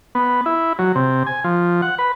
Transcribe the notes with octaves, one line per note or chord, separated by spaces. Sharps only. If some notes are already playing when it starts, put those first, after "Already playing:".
B3
E4
F#3
C3
G#5
F3
F#5
B4